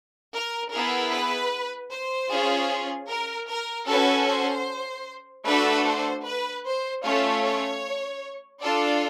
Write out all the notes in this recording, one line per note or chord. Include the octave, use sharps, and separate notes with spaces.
A#4
B3 E4 G#4 A#4
B4
C5
C#4 F4 G#4
A#4
A#4
C#4 F#4 A4 B4
C5
A3 D4 F#4 A4 B4
C5
B4
C5
A3 C#4 F4 C#5
C#5
D4 F4 A4 D5